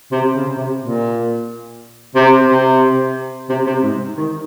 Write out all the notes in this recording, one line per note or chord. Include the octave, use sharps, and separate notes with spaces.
C3
C#3
C3
A#2
C3
C3
C3
C3
G#2
D#3